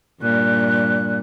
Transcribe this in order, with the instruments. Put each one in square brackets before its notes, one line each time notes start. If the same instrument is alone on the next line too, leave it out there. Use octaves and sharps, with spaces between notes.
[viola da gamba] G2 A#2 [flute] F#6